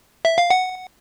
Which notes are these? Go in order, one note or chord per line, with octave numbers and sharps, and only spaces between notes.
E5
F5
F#5